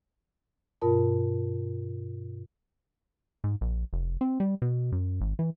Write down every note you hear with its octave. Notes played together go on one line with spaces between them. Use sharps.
G2 B2 F4 A#4 A5
G#2
A#1
F1
C4
G3
B2
F#2
G#1
E3